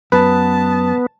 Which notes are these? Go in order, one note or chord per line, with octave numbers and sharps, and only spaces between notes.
F#2 B3 B4 A5